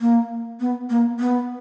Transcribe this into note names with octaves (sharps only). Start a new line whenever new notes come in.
A#3
B3
A#3
B3